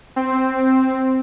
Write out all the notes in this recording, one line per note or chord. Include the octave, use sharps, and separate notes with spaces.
C4